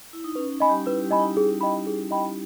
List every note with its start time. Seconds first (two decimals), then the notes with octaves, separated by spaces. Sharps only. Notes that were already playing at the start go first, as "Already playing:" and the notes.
0.13 E4
0.24 D#4
0.35 C#4 B4
0.53 D#4
0.60 D#5 G#5 B5
0.69 G3 G4
0.86 E4 B4
1.03 G3 G4
1.11 D#5 G#5 B5
1.19 D#4
1.37 G#4
1.61 D#5 G5 B5
1.87 G#4
2.11 D#5 G5 B5